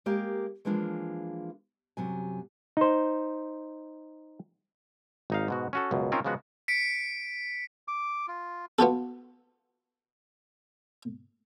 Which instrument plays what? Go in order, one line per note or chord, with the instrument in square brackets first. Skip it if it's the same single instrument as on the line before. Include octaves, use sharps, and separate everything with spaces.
[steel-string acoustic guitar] G#3 A#3 G4 A#4 F5
E3 F3 G#3 A#3 D4 F4
F#2 C3 F#3 G#5
[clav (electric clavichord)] D#4 C5
G#1 D#4 F5
G#2 B2 F#4
C#4 F#4 A4
C#2 F#2 B2
C4 C#4 D#4 F4 A#4 C5
C#3 F3 G#3 B3 F#4
[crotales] B6 C#7 D7
[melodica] D6
F4
[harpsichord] B3 F4 F#4 A4